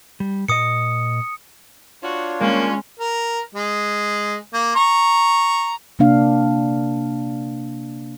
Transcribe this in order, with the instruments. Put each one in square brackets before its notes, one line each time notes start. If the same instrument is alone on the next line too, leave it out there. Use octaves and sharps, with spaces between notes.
[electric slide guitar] G3
[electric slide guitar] A#2 D#5 [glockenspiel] D#6 C#7
[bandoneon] D4 F4 C#5 [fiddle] F#4
[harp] G#3 [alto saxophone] A#3 [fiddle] C#4
[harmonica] A#4
G#3
A#3
A#5 C#6
[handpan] C3 A#3 D4 F5